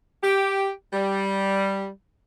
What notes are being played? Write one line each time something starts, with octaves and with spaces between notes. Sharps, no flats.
G4
G3